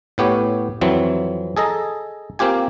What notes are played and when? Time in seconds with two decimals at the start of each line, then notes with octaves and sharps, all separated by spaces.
0.18 A2 B3 G4 C#5
0.81 F2 E3 F#3 C4
1.57 G#4 A4 D#5 A#5
2.39 A#3 C4 F4 G4 G#5